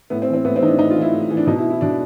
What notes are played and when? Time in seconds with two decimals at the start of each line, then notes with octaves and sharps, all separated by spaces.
0.10 A2 B3
0.22 C4
0.28 E3
0.34 C4
0.45 A2 B3
0.56 C4
0.62 E3 D#4
0.67 D4
0.79 A2 D#4
0.91 F4
0.97 E3 E4
1.13 A2
1.30 E3
1.37 D4
1.47 B2 D#4
1.58 E4
1.70 E4
1.81 B2 D4